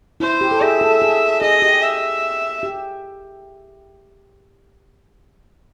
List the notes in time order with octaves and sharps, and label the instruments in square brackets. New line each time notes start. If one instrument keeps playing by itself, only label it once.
[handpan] E4 [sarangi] C5
[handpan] G4
A4
[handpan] G#4 [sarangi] E5
[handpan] A4
G#4
[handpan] G#4 [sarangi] D#5
[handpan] G4
[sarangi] E5
[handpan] G4